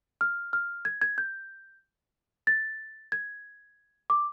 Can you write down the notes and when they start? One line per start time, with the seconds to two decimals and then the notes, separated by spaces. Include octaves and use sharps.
0.21 F6
0.53 F6
0.85 G#6
1.02 G#6
1.18 G6
2.47 A6
3.12 G#6
4.10 D6